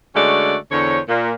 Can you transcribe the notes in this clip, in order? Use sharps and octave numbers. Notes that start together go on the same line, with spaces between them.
D3 G#3 A3 C#4 F#4 D5
E2 D3 C5 C#5
A#2